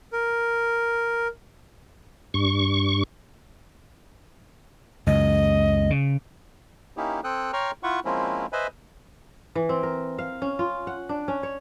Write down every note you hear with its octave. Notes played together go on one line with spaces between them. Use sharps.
A#4
G2 C#6
C#2 F#2 D#5
C#3
A#3 C#4 D#4 E4 G4
C4 A4 G5 D#6 F#6
C#5 G5 A#5 C6 C#6 F6
E4 F4 F#5 C#6
F3 G#3 A#3 C4 C#4 E4
B4 C5 D#5 E5 G#5 B5
E3
C4
A#4
F5
C#4
F4
F#5
D4
C#4
C#5